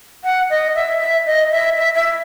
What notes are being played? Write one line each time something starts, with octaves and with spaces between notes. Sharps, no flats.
F#5
D#5
E5
E5
D#5
E5
E5
E5